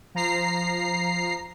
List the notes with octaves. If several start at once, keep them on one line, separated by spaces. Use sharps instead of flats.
F3 A#5 C7